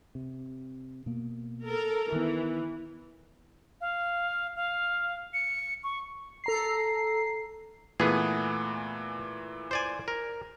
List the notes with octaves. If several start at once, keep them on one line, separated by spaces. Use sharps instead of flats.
C3
B2 A#3
A4 A#4
D#3 E3 B3
F5
F5
C#7
C#6
A4 A#5 C7
A#2 E3 A3 B3 G#4
C5 D5 G#5
A#4